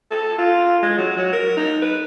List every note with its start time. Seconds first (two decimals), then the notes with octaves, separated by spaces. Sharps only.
0.11 A4
0.38 F4
0.82 G#3
0.97 F#3
1.16 F#3
1.32 A#4
1.57 D#4
1.82 B4